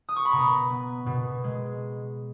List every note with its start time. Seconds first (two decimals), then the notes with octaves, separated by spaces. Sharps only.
0.09 D#6
0.16 C#6
0.25 B5
0.32 B2 A#5
0.70 B3
1.06 B2
1.44 G#3